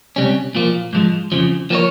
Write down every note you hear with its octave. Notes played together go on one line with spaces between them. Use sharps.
C#2 C3 G3 C#4
A#2 F3 A#3
G#2 F3 G#3
F2 C#3 F3
F3 A#3 F4 A#4 C#5